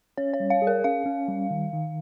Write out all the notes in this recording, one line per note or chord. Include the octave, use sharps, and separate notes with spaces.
C#4 C#5
C#5
G3
F5
G#4
A#4
C#4 F5
C#4
G3
D#3
D#3